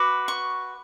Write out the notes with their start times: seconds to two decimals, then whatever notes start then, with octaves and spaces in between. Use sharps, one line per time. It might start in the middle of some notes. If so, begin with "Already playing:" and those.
Already playing: F#4 B4 D6
0.28 C#6